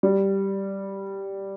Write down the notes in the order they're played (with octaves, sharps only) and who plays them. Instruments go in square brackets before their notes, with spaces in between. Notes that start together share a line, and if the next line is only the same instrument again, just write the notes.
[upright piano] G3